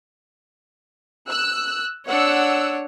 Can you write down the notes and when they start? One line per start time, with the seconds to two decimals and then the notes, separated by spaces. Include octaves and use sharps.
1.28 E6 F#6
2.06 D4 C#5 F#5 E6